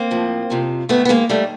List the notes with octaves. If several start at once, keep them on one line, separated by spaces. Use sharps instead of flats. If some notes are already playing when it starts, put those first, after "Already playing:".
Already playing: A#3 C4
A2 F3
F2 C3 F3
G#2 D#3 A3 B3
B3
G#3 A#3
D#2 D#3 G3 A3